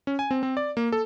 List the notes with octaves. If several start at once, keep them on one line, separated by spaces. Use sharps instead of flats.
C#4
G#5
C4
C4
D5
A#3
A4